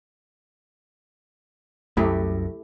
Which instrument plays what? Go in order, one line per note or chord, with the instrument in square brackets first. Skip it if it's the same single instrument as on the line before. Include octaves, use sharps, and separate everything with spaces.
[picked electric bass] C2 F#2 [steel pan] A3 E4 G4